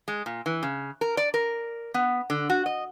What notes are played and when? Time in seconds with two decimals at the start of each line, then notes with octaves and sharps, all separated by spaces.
0.08 G#3
0.26 A#2
0.46 E3
0.63 C#3
1.01 A#4
1.17 D5
1.34 A#4
1.94 B3
2.30 D3
2.50 F#4
2.66 D#5